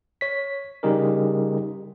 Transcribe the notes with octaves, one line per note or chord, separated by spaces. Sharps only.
C#5 B6
C#3 G3 D#4 G4 G#4 A#4